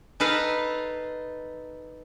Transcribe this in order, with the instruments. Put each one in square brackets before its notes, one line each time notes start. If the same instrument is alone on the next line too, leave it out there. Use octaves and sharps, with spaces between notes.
[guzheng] D#4 A4 B4 F5